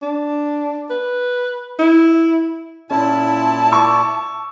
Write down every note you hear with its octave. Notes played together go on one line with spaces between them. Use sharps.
D4
B4
E4
A#2 C#4 E4 A5
C#6 D6 E6